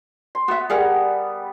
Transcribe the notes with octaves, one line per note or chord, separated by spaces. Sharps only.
C6
B3 F#4 E5
G3 G#4 A#4 F#5